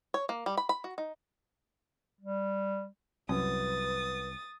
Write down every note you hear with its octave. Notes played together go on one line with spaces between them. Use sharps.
C#5
A#3
G3
B5
B5
F#4
D#4
G3
C2 F#2 B4 D#6 A6